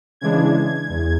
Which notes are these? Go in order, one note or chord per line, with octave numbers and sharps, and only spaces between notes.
C#3 E3 G#3 D4 G#6
E2